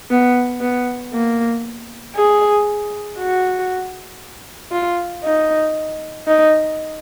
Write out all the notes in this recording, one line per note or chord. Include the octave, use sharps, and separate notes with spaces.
B3
B3
A#3
G#4
F#4
F4
D#4
D#4